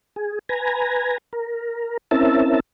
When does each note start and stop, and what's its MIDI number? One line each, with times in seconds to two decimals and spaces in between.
0.16 0.39 68
0.49 1.18 71
0.49 1.18 80
0.49 1.18 82
1.33 1.97 70
2.11 2.60 60
2.11 2.60 61
2.11 2.60 64
2.11 2.60 70
2.11 2.60 76
2.11 2.60 81